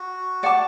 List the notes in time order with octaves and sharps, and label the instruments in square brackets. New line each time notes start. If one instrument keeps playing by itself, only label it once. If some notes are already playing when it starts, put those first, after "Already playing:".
Already playing: [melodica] F#4
[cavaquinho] D5 F#5 A5 D6